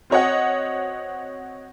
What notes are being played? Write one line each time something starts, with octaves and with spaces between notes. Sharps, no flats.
C4 F#4 C#5 D#5 F#5